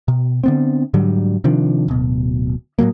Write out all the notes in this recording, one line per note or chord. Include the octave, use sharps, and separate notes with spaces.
B2
D3 B3 C4
G#2 D3 F#3 G3
C3 D#3 F3 D4
D1 B2
A2 D3 F#3 A#3